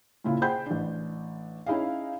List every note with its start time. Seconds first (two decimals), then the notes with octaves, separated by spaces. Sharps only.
0.24 A#2 C#3 E4 F4
0.42 G#4 C5 F#5 G5 B5 G6
0.66 A1 D4
1.66 C#4 D#4 E4 G#4 D#5 F5